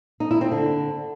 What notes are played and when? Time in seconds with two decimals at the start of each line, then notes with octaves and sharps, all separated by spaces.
0.20 D#4
0.31 E4
0.41 C4
0.51 D3